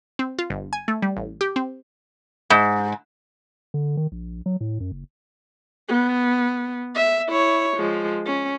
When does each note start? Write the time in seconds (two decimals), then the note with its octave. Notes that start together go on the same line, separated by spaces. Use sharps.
0.19 C4
0.39 F4
0.50 G1
0.73 G#5
0.88 A3
1.02 G3
1.17 A1
1.41 G4
1.56 C4
2.50 G#2
3.74 D3
3.97 D#3
4.12 A#1
4.46 F#3
4.61 A2
4.80 F#2
4.92 F#1
5.88 B3
6.95 E5
7.28 E4 C#5
7.76 F3 G#3
8.26 C#4